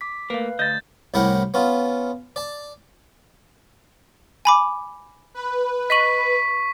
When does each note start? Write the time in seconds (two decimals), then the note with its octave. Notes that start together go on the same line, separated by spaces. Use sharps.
0.01 D6 B6
0.30 A3 A#3 B4 F5
0.59 D2 D#5 G6 A6
1.14 C2 A2 E4 G4 A#4 F#5
1.54 B3 C#4 F4
2.36 D5 A5
4.45 G#5 B5 D6
5.34 B4
5.90 D#5 C#6 B6 D#7 F#7